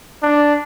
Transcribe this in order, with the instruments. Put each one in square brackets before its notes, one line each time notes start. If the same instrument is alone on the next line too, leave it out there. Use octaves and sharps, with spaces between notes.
[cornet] D4